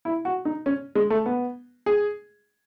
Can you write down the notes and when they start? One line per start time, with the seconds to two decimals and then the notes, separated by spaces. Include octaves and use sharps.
0.05 E4
0.25 F#4
0.45 D#4
0.66 C#4
0.95 G#3
1.10 A3
1.26 B3
1.86 G#4